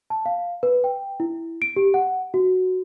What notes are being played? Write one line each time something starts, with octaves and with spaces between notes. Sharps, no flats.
A5
F5
B4
G5
E4
D7
G4
F#5
F#4